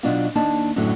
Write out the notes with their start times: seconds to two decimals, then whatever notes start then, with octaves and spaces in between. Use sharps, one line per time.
0.03 B2 F#3 D4 D#4 F4 F5
0.35 D#2 A#3 D4 D#4 A5
0.76 F#2 A2 D3 F#3